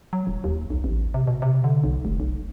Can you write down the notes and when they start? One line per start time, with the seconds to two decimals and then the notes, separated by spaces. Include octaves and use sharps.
0.13 F#3
0.27 D#1
0.44 D#2
0.70 B1
0.84 A1
1.14 C3
1.27 B2
1.42 C3
1.64 D3
1.84 B1
2.05 F1
2.20 B1